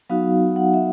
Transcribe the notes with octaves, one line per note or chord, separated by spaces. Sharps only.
F#3 B3 D#4 F#4 F5
F#5
E5